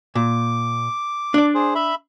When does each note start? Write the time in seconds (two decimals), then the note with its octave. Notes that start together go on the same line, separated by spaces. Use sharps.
0.15 A#2 D6
1.34 D4 D5
1.55 G#4 C5
1.75 E5 B5